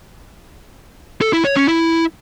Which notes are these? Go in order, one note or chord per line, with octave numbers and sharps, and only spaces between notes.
A4
E4
C#5
C#4
E4